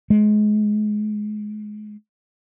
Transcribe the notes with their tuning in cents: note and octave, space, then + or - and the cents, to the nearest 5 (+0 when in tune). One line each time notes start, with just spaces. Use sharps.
G#3 +25